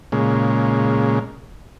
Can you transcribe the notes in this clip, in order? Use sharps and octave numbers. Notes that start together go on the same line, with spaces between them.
A#2 C#3 G#3